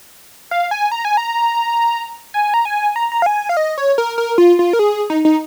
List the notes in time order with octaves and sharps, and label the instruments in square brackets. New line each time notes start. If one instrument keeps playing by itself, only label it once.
[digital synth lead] F5
G#5
A#5
G#5
A#5
G#5
A#5
G#5
A#5
A#5
F5
G#5
F5
D#5
C#5
A#4
A#4
F4
F4
A#4
G#4
D#4
D#4